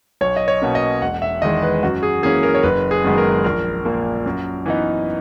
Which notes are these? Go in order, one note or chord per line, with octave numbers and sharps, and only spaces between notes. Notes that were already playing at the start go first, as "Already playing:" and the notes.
B1 C#5
D#5
C#5
B2 A#3 C#4
D#5
E1 F#5
E5
E2 D#3 G#3 D#5
B4
F#2 F#4
G#4
E3 A#3 C#4 G#4
A#4
C#5
F#1 B4
G#4
F#2 D#3 G#3 B3
A#4
A#1 A#4
A#2 A#3
F#2
E3 B3 D#4